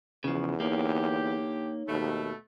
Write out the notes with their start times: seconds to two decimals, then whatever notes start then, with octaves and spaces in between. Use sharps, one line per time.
0.24 E2 C#3 F3 C#6
0.60 D3 A#3 D#4 G4 C#5
1.88 D#2 B2 A3